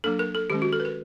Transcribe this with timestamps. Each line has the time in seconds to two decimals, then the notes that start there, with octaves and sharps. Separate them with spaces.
0.04 F#3 A#3 D4 A4
0.19 A#4
0.35 A4
0.50 D#3 G#3 C#4 G4
0.62 F#4
0.72 A4
0.80 B4
0.85 A#4